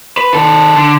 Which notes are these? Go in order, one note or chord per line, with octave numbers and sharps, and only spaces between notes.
B4
D#3 A4
D3